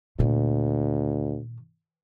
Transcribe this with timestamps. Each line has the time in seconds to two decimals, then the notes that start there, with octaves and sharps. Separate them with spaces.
0.19 D2 A#2 D#3